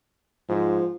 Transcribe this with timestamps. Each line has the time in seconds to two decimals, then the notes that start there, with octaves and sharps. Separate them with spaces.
0.49 G#2 F3